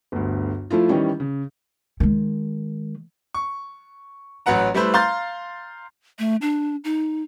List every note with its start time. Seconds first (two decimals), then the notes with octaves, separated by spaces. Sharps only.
0.12 G1 D2
0.70 F3 A3 E4 F4
0.89 D#3 E3 G3 C#4
1.20 C#3
2.00 D#3 G#3
3.34 C#6
4.46 A1 F#3 B4 F#5 A#5
4.74 G3 A3 E4 B4 C5
4.94 F5 A#5 C6 G6 A6
6.19 A3
6.42 D4
6.84 D#4